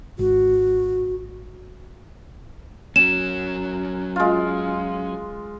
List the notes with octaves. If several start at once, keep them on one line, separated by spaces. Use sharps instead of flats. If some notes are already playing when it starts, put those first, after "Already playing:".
G#1 F#4
F#3 C#4 E7
G#3 F4